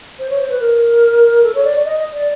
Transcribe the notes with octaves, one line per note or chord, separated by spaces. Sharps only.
C5
C#5
C5
B4
A#4
A4
C#5
D5
D#5
D5